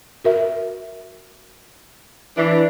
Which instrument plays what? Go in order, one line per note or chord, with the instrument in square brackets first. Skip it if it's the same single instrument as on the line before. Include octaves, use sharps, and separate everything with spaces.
[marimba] F#4 A#4 E5
[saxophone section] E3 D4